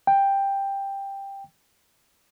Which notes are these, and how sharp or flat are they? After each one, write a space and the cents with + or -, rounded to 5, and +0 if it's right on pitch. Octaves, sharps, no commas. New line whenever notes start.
G5 +10